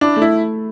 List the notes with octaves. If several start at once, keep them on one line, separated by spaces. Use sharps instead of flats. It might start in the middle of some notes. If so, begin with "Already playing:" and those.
D4 E4
A3
E4